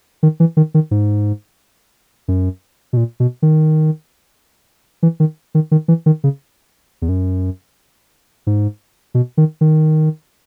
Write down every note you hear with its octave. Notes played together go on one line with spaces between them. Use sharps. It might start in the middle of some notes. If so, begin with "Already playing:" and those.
D#3
E3
D#3
D#3
G#2
F#2
B2
A#2
B2
D#3
E3
D#3
D#3
D#3
E3
D#3
C#3
E2
F#2
G#2
B2
D#3
D#3